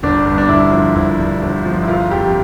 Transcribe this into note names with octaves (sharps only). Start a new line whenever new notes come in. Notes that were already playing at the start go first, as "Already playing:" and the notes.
G1 D4
G2
D4
G1 E4
F3
G1 E4
G2
G1
F3
E4
G1 F4
F2 G4